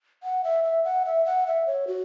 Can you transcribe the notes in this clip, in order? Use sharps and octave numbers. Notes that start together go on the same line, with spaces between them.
F#5
E5
E5
F#5
E5
F#5
E5
C#5
F#4